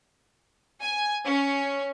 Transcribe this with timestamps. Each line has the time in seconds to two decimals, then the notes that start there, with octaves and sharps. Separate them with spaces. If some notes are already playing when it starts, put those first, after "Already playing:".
0.81 G#5
1.25 C#4